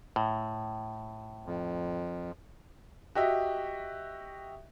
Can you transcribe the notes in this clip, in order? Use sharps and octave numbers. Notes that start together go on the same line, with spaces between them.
A2
F2
F#4 G4 D#5 E5